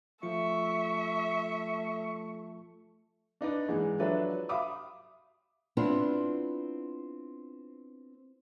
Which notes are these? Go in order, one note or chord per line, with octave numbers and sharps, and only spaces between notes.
F3 A3 F4 E5 C#6
D4 D#4 B4 D5
G#2 E3 G#3
F3 F#3 D4 A4 B4 E5
E5 F5 B5 D6 D#6
B3 C4 D4 E4 F4 B4